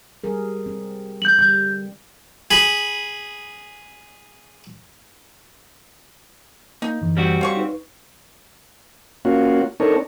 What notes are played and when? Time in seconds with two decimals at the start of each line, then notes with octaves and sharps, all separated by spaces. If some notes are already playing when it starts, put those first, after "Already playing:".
0.24 G3 G#4 A#4
0.66 C4
1.22 G6 F#7
1.39 D3 G3 G6
2.51 G#4 B5
6.82 A#3 D#4
7.01 F#2 D3 E3
7.17 G3 C4 F#4
7.41 F4 C#5 C#6
7.57 D#4 B4
9.25 A#3 C#4 F4 F#4
9.80 C4 D4 D#4 A4 A#4 C#5